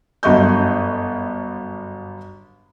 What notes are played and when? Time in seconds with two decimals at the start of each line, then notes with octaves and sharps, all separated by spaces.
0.23 G1 F#2 D#5 C#6 G6